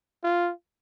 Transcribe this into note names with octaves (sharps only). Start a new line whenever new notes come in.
F4